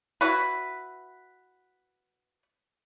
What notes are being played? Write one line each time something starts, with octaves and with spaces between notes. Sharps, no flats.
E4 F#4 B4